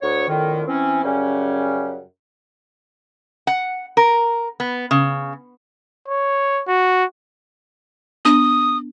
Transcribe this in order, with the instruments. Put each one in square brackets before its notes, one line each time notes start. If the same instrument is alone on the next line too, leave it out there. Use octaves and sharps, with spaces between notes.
[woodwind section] D2 C#5
F2 A2 D3 D#3
E3 C4 C#4
F#2 C#3 G3 C#4
[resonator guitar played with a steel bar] F#5
A#4
B3
C#3
[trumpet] C#5
F#4
[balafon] B3 D4 [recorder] D#6